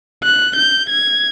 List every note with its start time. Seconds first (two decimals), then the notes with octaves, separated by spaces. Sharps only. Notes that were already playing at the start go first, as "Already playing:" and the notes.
0.24 F#6
0.57 G6
0.90 G#6